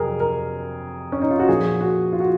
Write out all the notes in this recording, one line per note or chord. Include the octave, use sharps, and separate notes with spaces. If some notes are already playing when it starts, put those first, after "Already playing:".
Already playing: F2 C3 F#3 G#4 A#4
A#4
C#4
D#4
F4
F#4
A#2 F3 G#4
F#4
F4
F#4